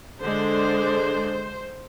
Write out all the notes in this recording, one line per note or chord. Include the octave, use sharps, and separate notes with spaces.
D3 G#3 D4 C5